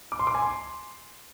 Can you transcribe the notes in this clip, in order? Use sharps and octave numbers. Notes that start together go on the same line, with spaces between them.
D6
C6
D6
G#5
C6